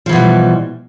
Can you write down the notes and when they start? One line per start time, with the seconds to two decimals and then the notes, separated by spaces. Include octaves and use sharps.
0.06 F3
0.09 E3
0.13 B2
0.16 G3